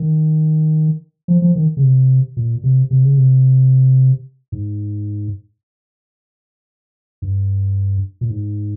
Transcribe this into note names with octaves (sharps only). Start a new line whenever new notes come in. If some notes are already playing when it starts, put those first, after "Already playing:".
Already playing: D#3
F3
F3
D#3
C#3
C3
A#2
C3
C3
C#3
C3
G#2
G2
A#2
G#2